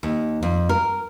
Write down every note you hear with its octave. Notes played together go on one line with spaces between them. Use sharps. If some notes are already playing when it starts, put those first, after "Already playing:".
D#2
F2
A#4